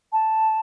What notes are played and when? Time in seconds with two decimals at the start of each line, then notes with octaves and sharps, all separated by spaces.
0.13 A5